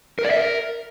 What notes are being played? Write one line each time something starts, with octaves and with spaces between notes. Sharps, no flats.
A#4
D5
E5
A#4